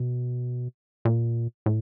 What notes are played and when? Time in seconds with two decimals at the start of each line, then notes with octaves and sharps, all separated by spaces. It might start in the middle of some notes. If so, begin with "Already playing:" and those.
Already playing: B2
1.05 A#2
1.66 A2